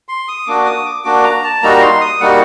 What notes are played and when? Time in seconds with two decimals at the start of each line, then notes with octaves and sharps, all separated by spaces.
0.09 C6
0.28 D#6
0.47 A#3 D4 F#4 D6
0.66 D#6
0.85 D6
1.04 A#3 D4 F#4 D6
1.24 A#5
1.44 A5
1.62 G3 A#3 D#4 F#4 A#5
1.82 C6
2.01 D#6
2.20 G3 A#3 D#4 F#4 F#5